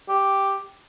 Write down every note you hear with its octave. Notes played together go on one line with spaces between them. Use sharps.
G4